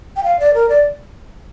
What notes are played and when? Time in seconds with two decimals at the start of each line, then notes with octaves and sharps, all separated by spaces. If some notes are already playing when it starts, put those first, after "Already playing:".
0.16 G5
0.24 F5
0.40 D5
0.54 A#4
0.69 D5